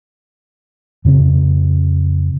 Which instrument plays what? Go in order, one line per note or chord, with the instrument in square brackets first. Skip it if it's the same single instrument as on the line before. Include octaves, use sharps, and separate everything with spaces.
[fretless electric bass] F2 C#3 A#3 C4